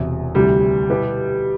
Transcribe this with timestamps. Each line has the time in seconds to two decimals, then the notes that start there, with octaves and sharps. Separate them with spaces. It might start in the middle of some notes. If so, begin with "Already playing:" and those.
Already playing: E1 E2 C3 E3
0.35 D2 C3 E3 G3
0.90 B2 B3 E4 G4 B4